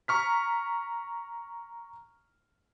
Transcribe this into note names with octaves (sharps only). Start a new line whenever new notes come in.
A#5 C#6 F6 B6